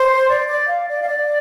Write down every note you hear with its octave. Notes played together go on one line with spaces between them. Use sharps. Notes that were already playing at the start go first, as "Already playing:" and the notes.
Already playing: C5
D5
D5
F5
D5
F5
D5